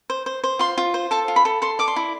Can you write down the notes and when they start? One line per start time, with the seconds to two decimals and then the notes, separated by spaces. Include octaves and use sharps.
0.10 C5
0.26 C5
0.44 C5
0.59 F4 C6
0.78 F4
0.94 C5
1.11 A4 A5
1.28 F4
1.36 B5
1.45 A4
1.62 A4 C6
1.79 D5 D6
1.88 C6
1.96 E4